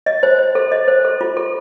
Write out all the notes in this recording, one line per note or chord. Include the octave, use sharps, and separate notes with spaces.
D#5
C5
C5
A4
D#5
C5
A4
F4
A4